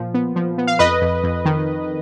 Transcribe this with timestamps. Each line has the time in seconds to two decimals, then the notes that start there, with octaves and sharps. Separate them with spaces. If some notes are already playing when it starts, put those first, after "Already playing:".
Already playing: A#2 F3
0.14 B3
0.36 F3
0.58 B3
0.67 F5
0.79 F2 B4 D#5
1.01 F2
1.24 F2
1.45 D#3